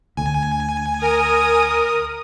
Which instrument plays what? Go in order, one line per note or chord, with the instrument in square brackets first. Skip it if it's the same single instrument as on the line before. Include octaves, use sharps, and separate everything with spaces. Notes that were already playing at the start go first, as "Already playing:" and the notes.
[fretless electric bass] D2 [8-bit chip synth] G#5
[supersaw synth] A#4 [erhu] D#6